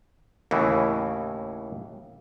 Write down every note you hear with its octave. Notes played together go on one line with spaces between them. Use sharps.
D#2 A2 C#3 E3